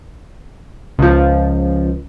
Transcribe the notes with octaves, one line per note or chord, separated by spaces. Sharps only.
C#2 F3